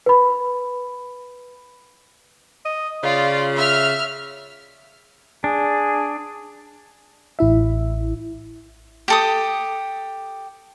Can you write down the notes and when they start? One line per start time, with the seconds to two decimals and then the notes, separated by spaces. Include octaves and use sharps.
0.06 B4 B5
2.65 D#5
3.03 C#3 F4 D5
3.56 E5 F6
5.44 D4 G#4
7.39 A1 E4 E5
9.08 G4 A4 D#6